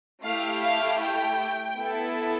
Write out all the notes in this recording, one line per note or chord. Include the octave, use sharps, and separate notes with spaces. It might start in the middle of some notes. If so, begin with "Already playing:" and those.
A3 E4 G4 F5
F5
G5
B3 E4 A4